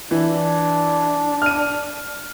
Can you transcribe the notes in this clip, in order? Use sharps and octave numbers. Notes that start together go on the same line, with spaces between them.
E3 D4
F6 D#7